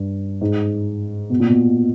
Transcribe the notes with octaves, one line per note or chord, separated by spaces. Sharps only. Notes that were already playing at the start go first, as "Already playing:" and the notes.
Already playing: G2
G#2
B2
A#2
B2